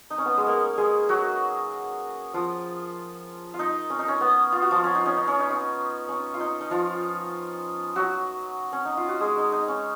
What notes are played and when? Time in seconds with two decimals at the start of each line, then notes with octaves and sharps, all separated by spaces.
0.10 D#4
0.18 C#4
0.25 B3
0.37 G#3
0.47 A#3
0.78 G#3 G#4
1.09 F#3 F#4
2.34 F3 F4
3.54 F4
3.59 D#4
3.90 C#4
3.99 D#4
4.08 C#4
4.21 B3
4.52 F4
4.62 F#4
4.71 F3 F4
4.84 C#4
4.95 D#4
5.06 C#4
5.17 D#4
5.27 C#4
5.39 D#4
5.51 C#4
6.09 C#4
6.34 F4
6.40 D#4
6.61 D#4
6.70 F3 F4
7.96 F#3 F#4
8.73 C#4
8.85 D#4
8.97 F4
9.08 F#4
9.20 G#3 G#4
9.37 D#4
9.52 D#4
9.68 C#4